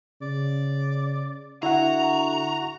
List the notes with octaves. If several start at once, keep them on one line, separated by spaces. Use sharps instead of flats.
C#3 D5
D3 E4 F#4 E5 F#5 A#5